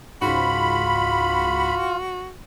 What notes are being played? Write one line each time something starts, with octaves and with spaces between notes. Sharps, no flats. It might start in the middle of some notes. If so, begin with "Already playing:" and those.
C#2 G#2 F4 F#4 B5